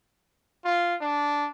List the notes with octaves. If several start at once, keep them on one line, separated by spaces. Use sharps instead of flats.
F4
D4